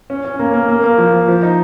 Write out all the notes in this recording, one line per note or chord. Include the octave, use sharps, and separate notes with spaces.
C#4
C#4
A#3
A#3
A#3
A#3
F3
F3
F3
D#4